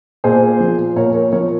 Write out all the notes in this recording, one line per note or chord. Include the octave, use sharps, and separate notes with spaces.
A#2 G#4 C5
F3
A#2 A#4 C#5
A#4 C#5
F3 A#4 C#5